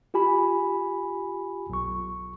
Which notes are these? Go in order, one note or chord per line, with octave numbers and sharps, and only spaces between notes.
F4 G4 G#5 B5
B1 C#6